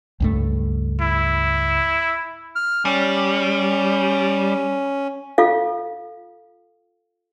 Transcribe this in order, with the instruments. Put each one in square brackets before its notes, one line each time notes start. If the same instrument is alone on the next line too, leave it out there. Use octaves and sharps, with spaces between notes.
[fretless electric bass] C#2 G2 A3
[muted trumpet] E4
[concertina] F6
[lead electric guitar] G3 [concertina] C#4
[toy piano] F4 A4 F5